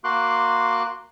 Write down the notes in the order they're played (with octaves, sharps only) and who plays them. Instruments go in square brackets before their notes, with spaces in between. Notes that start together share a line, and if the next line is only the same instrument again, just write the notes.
[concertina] A#3 F#4 C6 D6 F#6